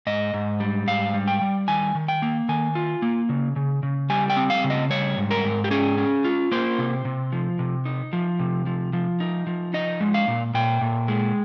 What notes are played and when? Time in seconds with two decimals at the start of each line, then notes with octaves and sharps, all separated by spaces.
0.07 G#2 D#5
0.34 G#2
0.60 G3
0.87 G#2 F5
1.14 G3
1.28 G5
1.41 G3
1.68 D#3 G#5
1.95 D#3
2.08 G5
2.22 A#3
2.49 D#3 G#5
2.75 F4
3.02 A#3
3.29 C#3
3.56 C#3
3.83 C#3
4.10 G3 G#5
4.30 G5
4.37 C4
4.50 F5
4.64 C#3
4.70 D#5
4.90 G3 C#5
5.17 G#2
5.31 A#4
5.44 G#2
5.64 G4
5.71 C#4 G#4
5.98 C#4
6.25 F4
6.51 A#3 C5
6.78 C3
7.05 C3
7.32 F3
7.59 C3
7.86 D#4
8.13 F3
8.39 C3
8.66 F3
8.93 F3
9.20 D#4
9.47 F3
9.74 D#4 D#5
10.01 G#3
10.14 F5
10.28 A#2
10.54 A#2 G5
10.81 A#2
11.08 G#3